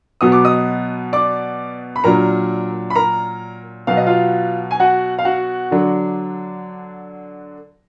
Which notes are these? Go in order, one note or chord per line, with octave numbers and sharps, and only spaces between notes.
B2 F#3 B3 D#6
D6
D#5 D#6
D5 D6
B5
A#2 F#3 D4 A#4 A#5
B5
A#4 A#5
B2 F#3 B3 F5
D#5
F4 F5
G#5
F#4 F#5
F5
F#4 F#5
D3 F#3 D4